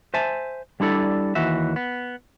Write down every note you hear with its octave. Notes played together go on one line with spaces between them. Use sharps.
C5 E5 G#5 A5
G3 D4 E4 A4 D5
D#2 E3 F#4 E5
B3